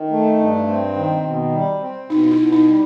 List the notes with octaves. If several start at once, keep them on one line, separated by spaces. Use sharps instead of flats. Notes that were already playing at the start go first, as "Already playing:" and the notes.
Already playing: D#3
A3
G2
C4
D#3
B2
G3
C4
B2 D#4
D#4
E4
B2
D#4
G3